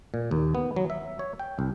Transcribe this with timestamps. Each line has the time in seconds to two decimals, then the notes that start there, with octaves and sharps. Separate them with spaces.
0.14 A#2
0.31 D#2
0.55 B3
0.76 F#3
0.90 E5
1.19 C#5
1.39 G5
1.59 C2